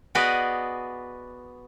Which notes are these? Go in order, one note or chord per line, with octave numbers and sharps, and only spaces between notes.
B3 F#4 G#4 B4 D5 D#5